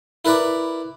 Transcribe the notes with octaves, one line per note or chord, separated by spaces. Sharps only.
E4 A#4 B4 D5